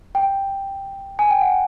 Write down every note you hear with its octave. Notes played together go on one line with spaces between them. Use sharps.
G5
G#5
G5
F#5